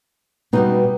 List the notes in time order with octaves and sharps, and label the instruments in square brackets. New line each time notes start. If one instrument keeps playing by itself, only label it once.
[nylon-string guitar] B2 G3 B3 D#4